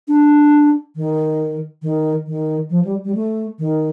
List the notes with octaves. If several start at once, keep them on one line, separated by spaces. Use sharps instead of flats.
D4
D#3
D#3
D#3
F3
G3
G3
A3
D#3